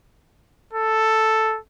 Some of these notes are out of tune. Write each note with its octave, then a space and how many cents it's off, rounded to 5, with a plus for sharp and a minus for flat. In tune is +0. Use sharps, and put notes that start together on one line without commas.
A4 +0